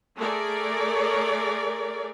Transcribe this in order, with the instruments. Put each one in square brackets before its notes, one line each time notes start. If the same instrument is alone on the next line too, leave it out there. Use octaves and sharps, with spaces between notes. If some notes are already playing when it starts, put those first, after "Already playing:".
[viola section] A3 G#4 A#4 D5